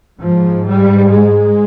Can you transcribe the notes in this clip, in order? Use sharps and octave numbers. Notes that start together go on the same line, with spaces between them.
G#2 F3
G3
G#3